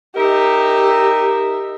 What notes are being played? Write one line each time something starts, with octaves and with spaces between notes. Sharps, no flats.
D#4 G4 A#4 E5